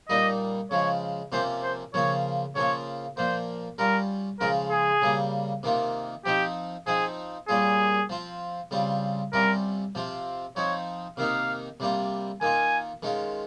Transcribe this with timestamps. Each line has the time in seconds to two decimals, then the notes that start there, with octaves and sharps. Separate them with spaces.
0.09 A#2 G3 A#3 D#4 D#5
0.71 C#3 F3 G#3 C#5
1.32 C3 F3 A#3 C#4 F4 C5
1.63 C5
1.94 C#3 F3 A#3 F4 C#5
2.55 C#3 F3 A#3 F4 C#5
3.17 A#2 F3 A#3 C5
3.78 G3 C#4 F4 A#4
4.40 C#3 F3 G#3 C#4 F4 A#4
4.71 G#4
5.02 C#3 G3 A#3
5.63 C3 D#3 A#3 F4
6.25 F3 C4 D#4 G4
6.87 F3 C4 D#4 G#4
7.49 A#2 G3 C#4 F4 G#4
8.09 F3 C4 F4
8.71 C#3 G3 C4 F4
9.33 C3 G3 C#4 F4 A#4
9.95 C3 F3 C4 F4
10.56 F3 C4 D#4 C#5
11.17 C3 D#3 A#3 D#4 F5
11.80 C3 G3 A#3 F4
12.41 D#3 A#3 F4 G#5
13.03 D#3 G#3 C#4 F4